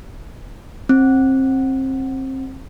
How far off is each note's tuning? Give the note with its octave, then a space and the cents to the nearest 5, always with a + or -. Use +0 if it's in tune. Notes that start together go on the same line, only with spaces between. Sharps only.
C4 +25